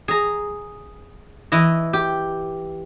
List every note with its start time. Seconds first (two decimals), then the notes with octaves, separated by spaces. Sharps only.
0.08 G#4 A#5
1.52 E3 E4 D#5
1.93 G4